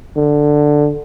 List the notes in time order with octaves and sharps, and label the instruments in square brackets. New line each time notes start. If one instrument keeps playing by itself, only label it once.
[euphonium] D3